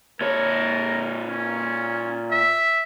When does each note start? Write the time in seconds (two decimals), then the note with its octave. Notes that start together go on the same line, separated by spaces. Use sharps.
0.21 A#2 A#4 C#5
1.27 C#4
2.31 E5